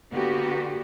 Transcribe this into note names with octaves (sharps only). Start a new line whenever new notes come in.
D3 A#3 B3 F#4 G4